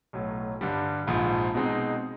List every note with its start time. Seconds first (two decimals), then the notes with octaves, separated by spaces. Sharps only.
0.13 B1 A2 F#3
0.61 G2 D3 G3
1.07 A#1 G#2 F3
1.55 B2 G#3 C4 D#4